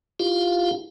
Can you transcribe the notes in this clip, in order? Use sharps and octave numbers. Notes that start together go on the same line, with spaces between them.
E4 F4 G4 F5